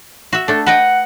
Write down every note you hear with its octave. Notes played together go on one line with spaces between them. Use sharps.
F#4 E5
A3 D4 A4
B4 D#5 F#5 G5